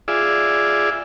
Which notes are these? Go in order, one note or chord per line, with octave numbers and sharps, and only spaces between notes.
F4 G#4 D5 E5